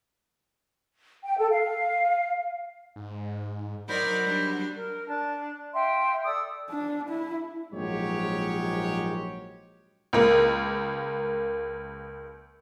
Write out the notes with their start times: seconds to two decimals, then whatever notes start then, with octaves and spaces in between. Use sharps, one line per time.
1.25 G5
1.37 A4
1.51 F5
2.96 G#2
3.89 F#3 D#4 A#4 C5 D5 B5
4.25 G3 D4
4.75 A#4
5.08 D4 A5
5.73 E5 F5 G5 C6
6.23 A4 D5 D#6 E6
6.70 D4
7.09 E4
7.73 A#1 G#2 F#3 G#3 G4 C#5
10.13 C#2 A#3